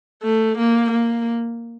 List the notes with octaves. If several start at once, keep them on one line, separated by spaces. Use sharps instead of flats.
A3
A#3
A#3